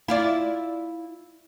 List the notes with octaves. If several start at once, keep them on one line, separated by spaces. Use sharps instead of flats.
E4 F4 D5